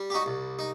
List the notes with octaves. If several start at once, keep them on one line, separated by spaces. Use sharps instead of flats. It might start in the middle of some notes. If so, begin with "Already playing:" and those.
Already playing: G3
G4
D#4 F#4
C2
D#4